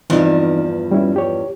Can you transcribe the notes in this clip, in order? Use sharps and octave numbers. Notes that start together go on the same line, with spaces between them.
E2 G2 E3 F3 C4 D#4
G3 C#4 E4
G4 C#5